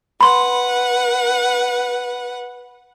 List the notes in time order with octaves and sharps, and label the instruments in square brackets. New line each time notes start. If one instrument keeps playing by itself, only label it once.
[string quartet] B4 F#5 [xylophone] B5 C6